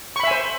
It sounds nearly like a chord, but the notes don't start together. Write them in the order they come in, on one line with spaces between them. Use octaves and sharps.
C#6 B5 E5 G#5 C5